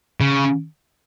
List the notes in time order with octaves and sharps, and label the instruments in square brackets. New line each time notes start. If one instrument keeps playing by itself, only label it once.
[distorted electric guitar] C#3